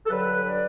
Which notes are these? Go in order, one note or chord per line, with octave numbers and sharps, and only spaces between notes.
A4
G2 D3 F#3 B4
D5